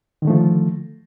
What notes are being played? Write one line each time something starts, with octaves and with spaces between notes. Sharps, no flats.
D3 D#3 F3 A3